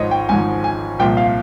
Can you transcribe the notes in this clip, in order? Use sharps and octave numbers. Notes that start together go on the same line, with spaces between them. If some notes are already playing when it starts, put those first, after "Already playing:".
Already playing: G#1 G#2 F3 C5 C#5 D#5
G5
G#1 G#2 F3 G#5
G#5
C2 A#2 F3 G5
F5